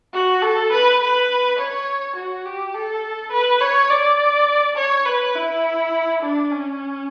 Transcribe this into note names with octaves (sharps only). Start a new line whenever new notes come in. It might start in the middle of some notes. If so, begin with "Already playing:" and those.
F#4
A4
B4
B4
C#5
F#4
G4
A4
B4
C#5
D5
C#5
B4
E4
D4
C#4